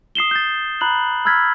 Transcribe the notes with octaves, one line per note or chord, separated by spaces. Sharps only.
D#6 C7 E7 G7
G6 A6
A#5 B5 F#6 F#7
B5 E6 F6 G#6 A6 B6